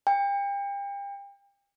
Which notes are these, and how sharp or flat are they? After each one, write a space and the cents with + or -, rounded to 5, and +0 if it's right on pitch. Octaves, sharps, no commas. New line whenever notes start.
G5 +35